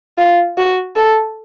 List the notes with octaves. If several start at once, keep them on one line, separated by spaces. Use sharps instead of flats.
F4
F#4
A4